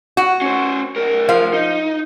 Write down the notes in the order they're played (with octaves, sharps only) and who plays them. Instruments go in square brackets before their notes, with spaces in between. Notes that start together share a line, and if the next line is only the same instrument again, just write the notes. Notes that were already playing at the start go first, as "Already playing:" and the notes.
[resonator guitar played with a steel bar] F#4
[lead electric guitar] C#4 C5
B1 A#4
[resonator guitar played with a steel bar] F3 F5
[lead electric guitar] D#4